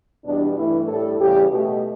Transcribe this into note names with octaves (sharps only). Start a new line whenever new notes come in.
E2 B2 G3 D4
G2 E3 A3 E4
A2 G3 A4
E2 C#3 G3 G4
B2 A3